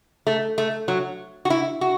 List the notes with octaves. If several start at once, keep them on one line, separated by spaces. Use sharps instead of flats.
A3
A3
F#3
F#4
E4
F#4